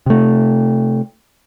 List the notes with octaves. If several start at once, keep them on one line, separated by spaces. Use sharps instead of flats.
C3 A3